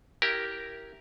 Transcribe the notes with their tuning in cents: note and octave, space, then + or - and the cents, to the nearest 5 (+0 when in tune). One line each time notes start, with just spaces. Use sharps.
E4 +5 G4 -10 A#4 +0